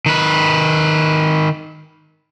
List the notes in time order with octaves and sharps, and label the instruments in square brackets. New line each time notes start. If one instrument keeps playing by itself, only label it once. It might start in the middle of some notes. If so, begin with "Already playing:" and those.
[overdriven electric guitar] D#3 B4